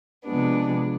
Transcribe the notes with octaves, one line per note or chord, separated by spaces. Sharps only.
C3 F3 G#3 B3 D4